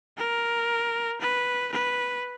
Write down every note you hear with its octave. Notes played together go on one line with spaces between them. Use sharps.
A#4
B4
B4